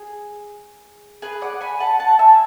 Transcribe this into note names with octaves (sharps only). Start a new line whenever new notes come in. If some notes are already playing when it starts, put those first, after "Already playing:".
Already playing: G#4
G#4 B4
D5 F#5
G#5 B5
F#5 A5
F#5 A5
E5 G#5